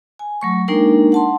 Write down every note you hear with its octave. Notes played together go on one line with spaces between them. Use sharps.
G#5
F#3 A3 C#6
G#3 A#3 D4 D#4 A#4 G5
F#5 A5 C6